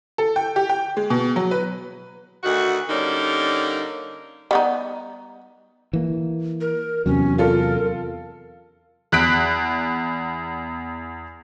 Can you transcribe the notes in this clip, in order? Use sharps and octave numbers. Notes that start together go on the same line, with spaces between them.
A4
G5
G4
G5
G#3
B2
F#3
B4
D2 D#3 F#4
D3 G3 A#3 C#4 D#4
G3 B3 D#4
E3 A#3
A#4
E2 C3 F#3 C#4
F4 A4 A#4
E2 F#6 B6 D7